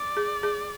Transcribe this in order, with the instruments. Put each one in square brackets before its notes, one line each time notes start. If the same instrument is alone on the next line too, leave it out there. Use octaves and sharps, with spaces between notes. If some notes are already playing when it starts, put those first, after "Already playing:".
Already playing: [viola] D5
[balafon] G#4
G#4